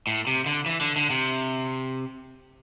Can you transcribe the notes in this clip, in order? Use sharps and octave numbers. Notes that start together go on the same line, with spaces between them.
A2
C3
D3
E3
D3
D3
C3